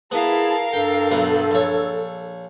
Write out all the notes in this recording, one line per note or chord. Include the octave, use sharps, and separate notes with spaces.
B3 E4 G#4 A#4 F5 A5
G2 A4 G5
B1 B3
A#1 C#5